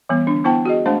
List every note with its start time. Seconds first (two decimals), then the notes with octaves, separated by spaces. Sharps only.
0.09 E3 G3 B3
0.27 D3 D4
0.44 B3 E4 C5 F#5 G5 A5
0.65 F#4 G#4 D#5
0.86 G#3 A3 D4 C5 A5